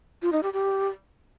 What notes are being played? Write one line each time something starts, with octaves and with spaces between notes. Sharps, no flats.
F4
D#4
G4
G4